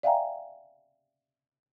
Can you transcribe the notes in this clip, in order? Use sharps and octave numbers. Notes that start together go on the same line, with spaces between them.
D5 E5 F5 G5 G#5 A#5